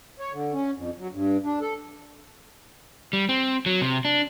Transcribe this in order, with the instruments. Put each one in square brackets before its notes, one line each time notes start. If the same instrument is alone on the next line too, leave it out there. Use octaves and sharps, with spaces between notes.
[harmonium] C#5
D3
C#4
F2
F#3
G2
D4
A4
[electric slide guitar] G3
C4
F#3
C3
D4